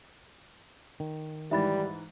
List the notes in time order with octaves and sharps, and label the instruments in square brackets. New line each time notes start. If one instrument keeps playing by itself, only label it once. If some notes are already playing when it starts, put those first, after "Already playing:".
[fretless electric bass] D#3
[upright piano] G#2 E3 [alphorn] G3 [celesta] E5 B5 A6